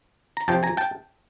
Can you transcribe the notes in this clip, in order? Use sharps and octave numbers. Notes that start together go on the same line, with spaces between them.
A#5
F2 C3 F3 G5 A5
G#5 A#5
G5 A5